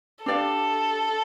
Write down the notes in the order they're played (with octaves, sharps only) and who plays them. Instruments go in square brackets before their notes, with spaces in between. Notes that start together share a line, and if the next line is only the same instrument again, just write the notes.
[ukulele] D4 G4 D5 F5 [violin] A4